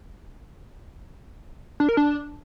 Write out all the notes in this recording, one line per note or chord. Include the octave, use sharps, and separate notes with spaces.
D4
A#4
D4